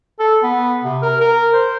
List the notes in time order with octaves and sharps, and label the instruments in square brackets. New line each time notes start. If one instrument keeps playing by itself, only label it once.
[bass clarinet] A4
B3
C3
A#4
A#4
C5